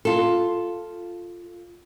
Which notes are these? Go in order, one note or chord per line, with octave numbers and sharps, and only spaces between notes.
F4 A4